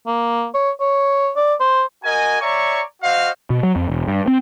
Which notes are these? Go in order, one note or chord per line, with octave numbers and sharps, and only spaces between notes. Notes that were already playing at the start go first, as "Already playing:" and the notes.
A#3
C#5
C#5
D5
C5
F#4 A#4 D#5 G#5
C#5 D5 E5 A#5 C#6
F#4 C5 D#5 F5
B2
F#3
F2
E1
G2
C4